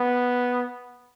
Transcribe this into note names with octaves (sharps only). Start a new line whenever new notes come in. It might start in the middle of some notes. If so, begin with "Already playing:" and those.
Already playing: B3